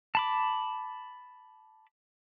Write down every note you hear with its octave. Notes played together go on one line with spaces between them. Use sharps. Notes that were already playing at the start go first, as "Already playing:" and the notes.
A5 B5 D6